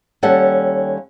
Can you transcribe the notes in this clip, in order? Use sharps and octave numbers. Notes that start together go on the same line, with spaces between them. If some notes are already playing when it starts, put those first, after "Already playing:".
D#2 G3 C#4 A4 F#5